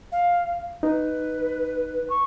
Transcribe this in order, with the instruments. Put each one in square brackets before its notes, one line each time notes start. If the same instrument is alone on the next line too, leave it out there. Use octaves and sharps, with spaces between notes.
[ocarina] F5
[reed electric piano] D#4 [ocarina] B4
[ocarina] C#6